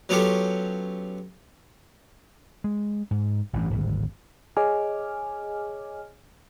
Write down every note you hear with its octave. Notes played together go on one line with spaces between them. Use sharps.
F#3 B3 C#4 F4 G4 A4
G#3
G#2
A1 G2 E3
D1 G#1 G2
G#4 C#5 D#5 G#5 D6 F6